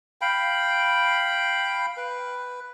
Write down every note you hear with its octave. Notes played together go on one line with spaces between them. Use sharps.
F5 G5 B5
B4